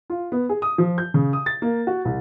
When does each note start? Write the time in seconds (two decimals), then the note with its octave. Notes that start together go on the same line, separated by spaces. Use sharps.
0.10 F4
0.32 B3
0.49 G#4
0.62 D#6
0.78 F3
0.98 G6
1.14 C#3
1.33 D#6
1.46 A6
1.62 A#3
1.87 F#4
2.05 C2